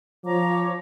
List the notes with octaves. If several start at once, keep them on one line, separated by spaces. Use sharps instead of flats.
F3 C#5 A#5 D6